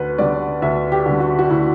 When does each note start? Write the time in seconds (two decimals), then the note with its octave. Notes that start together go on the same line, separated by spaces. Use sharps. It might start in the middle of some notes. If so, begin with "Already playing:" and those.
Already playing: D2 B4
0.19 D3 G3 D5
0.62 D2 E5
0.92 G4
1.06 D3 G3
1.20 F#4
1.39 F#4
1.50 D2 E4